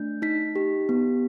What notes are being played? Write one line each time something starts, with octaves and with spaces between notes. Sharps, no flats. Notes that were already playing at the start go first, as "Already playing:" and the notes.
Already playing: A3 D4 G6
D#4 B6
G4
B3